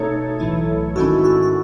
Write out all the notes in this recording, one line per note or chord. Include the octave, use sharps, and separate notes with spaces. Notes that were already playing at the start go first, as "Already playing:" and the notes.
Already playing: B2 A3 D#4 A4 C#5
B1 A2 E3 A3 E4
G#2 D#3 G#3 C#4 E4 F#4 A4
F#4
F#4